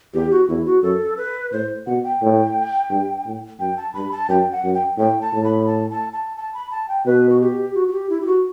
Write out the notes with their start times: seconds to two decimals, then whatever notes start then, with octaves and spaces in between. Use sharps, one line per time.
0.13 E2 G4
0.31 F#4
0.49 E2 E4
0.65 F#4
0.83 F#2 A4
1.17 B4
1.52 A2 C5
1.87 B2 F#5
2.04 G5
2.22 A2
2.90 G2
3.26 A2
3.59 F#2 G5
3.77 A5
3.94 G2 B5
4.12 A5
4.29 F#2 G5
4.52 F#5
4.64 F#2
4.75 G5
4.98 A2 G5
5.21 A5
5.33 A2
5.44 B5
5.67 A5
5.91 A5
6.13 A5
6.37 A5
6.54 B5
6.71 A5
6.89 G5
7.05 B2 B4
7.29 F#4
7.40 G4
7.75 F#4
7.88 F#4
7.92 G4
8.10 E4
8.21 G4
8.26 F#4